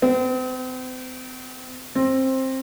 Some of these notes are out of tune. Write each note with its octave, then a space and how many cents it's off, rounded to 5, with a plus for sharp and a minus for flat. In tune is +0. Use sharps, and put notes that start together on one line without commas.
C4 -40
C4 +15